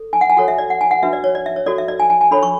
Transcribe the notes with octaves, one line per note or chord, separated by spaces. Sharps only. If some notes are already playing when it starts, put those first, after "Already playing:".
Already playing: A4
G#5
F#5
G#5
F#4 A4 C#5 F#5
E5
D5
F#5
G#5
F#5
D4 F#4 B4 E5
D5
C#5
D5
E5
C#5
F#4 A4 C#5 D5
E5
D5
G#5
G#5
G#5
D4 A4 C#5 B5
C#6